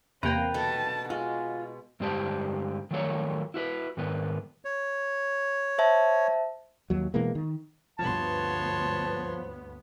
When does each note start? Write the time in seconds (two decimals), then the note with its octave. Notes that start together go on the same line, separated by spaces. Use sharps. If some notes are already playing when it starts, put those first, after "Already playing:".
0.23 E2 C3 A#3 B4 C5 G5 A#5
0.54 B2 B3 A4 A5
1.10 G#3 F4 F#4
2.00 G2 D3 G#3 G4 C5 A5
2.91 D#3 F3 F#3 A3 A4 C#5
3.54 E4 F#4 B4
3.97 G#2 D#3 B3 B4
4.65 C#5
5.78 C5 E5 A5
6.90 D#2 F#3
7.14 B2 E3 G#3 A#3
7.35 D#3
7.99 D2 G2 F3 B3 C#5 A5 C6